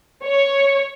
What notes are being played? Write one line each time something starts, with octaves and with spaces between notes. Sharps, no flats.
C#5